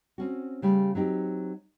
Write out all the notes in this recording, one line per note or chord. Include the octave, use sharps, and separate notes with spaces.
C4 C#4 F#4
C#3 G3 A3
F#3 C4 D#4 G4